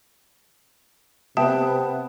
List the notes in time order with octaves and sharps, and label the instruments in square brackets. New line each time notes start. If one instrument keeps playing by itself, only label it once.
[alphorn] C3 [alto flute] B3 [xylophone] E5 A5 D#6 [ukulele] G5